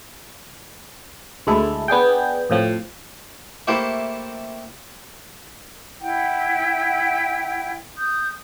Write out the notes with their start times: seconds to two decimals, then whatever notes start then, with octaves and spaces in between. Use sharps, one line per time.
1.47 D2 G#3 E4 A4
1.88 B3 D4 G#4 G5
2.50 F2 A2 F3 C4
3.67 A3 A#3 E4 G4 A4 C5
6.01 E4 F#5 G5
7.97 D#6 G6